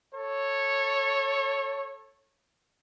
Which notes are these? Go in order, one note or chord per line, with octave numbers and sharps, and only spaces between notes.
A4 C#5